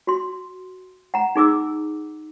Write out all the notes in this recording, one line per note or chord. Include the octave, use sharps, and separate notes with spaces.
F#4 C6
F#5 A#5
D#4 G#4 D6 E6